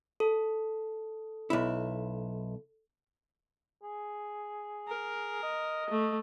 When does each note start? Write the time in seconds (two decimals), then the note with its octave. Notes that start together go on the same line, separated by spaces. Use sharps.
0.20 A4
1.50 B1 E4
3.83 G#4
4.88 A#4
5.43 D#5
5.90 A3